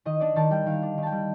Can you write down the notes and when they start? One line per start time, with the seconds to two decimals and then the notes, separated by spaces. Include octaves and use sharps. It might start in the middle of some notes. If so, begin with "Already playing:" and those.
0.05 D#3 D#5
0.20 D4 D5
0.36 D#3 A5
0.50 G3 G5
0.66 D#3 F5
0.82 D4
0.98 D#3
1.03 G5 A5
1.12 G3